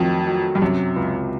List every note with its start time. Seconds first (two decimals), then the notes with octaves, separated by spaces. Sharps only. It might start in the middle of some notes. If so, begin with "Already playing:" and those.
Already playing: F2 D#3 F#3 A3
0.27 F#3
0.55 G2
0.62 F#2 C3
0.96 C#2